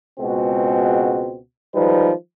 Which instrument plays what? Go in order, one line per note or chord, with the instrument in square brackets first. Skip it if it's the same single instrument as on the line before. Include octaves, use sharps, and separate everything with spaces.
[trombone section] C#2 B2 G#3 C4 F#4
D#3 F3 G3 G#3 D#4 B4